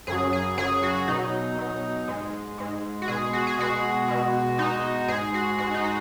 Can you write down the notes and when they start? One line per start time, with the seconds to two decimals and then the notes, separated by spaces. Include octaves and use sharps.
0.07 F#2 C#3 F#3 G#4
0.33 G#4
0.57 F#2 C#3 F#3 G#4
0.83 F#4
1.08 B2 F#3 D#4
1.58 B2 F#3
2.08 G#2 G#3
2.58 G#2 G#3
3.02 F#4
3.08 B2 G#3 G#4
3.33 F#4
3.47 G#4
3.58 B2 G#3 F#4
4.08 B2 G#3
4.58 B2 G#3 D#4
5.08 G#2 G#3 G#4
5.34 F#4
5.59 G#2 G#3 F#4
5.74 D#4
5.84 F#4